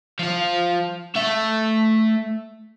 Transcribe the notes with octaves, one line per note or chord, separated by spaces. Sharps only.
F3 F4
A3 E5